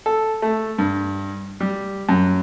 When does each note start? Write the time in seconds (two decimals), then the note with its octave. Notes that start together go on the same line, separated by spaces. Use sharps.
0.06 A4
0.42 A3
0.78 G2
1.60 G3
2.09 F#2